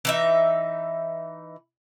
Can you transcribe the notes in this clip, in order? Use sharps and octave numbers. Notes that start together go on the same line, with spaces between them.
E3 D#4 E5